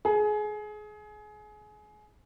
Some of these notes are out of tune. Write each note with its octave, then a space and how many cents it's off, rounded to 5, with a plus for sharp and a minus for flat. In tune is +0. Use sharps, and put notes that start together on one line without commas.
G#4 +25